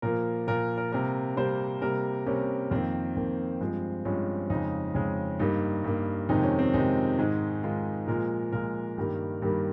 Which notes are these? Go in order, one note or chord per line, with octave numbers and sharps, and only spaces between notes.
A#2 F3 A#3 A#4
A#2 F3 A#3 A#4
A#4
C3 G3 A#3 A#4
C3 G3 A#3 C5
C3 G3 A#3 A#4
C3 G3 A#3 C#4
F2 D#3 A#3 C4
F2 D#3 A#3
G2 F3 G#3 C4
G2 F3 G#3 C#4
F2 C#3 G#3 D#4
F2 C#3 G#3
G2 G3 A#3 D#4
G2 G3 A#3
F2 C3 D#3 G#3 D#4
C#4
C4
F2 C3 D#3 G#3 D#4
G#2 D#3 G#3
G#2 D#3 G#3 F4
A#2 F3 G#3 A#4
A#2 F3 G#3 A#4
G2 D#3 G3 A#3
G2 D#3 G3 A#3